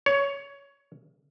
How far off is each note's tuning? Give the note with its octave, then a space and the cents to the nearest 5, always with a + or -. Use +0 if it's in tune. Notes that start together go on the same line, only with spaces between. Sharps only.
C#5 +15